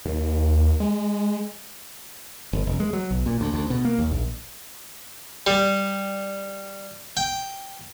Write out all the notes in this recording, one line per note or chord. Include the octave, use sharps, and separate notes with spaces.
D#2
G#3
G1
F1
G#3
F#3
B1
A#2
D2
D2
B2
A#3
D#2
A#1
G3
G5